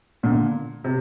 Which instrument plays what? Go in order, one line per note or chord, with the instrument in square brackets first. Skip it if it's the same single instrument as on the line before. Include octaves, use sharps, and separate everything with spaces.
[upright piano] A#2 D3
C3